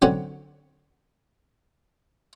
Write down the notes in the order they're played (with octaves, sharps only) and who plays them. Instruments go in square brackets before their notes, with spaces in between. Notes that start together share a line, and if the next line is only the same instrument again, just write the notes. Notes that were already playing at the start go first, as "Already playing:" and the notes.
[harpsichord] D3 F#3 C4 C#4